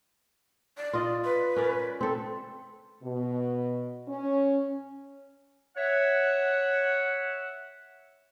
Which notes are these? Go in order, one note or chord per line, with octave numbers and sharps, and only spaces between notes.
D5
F4 D#5
B4
C#4 A#4 D5
C4 A4
B2
C#4
C#5 E5 F#5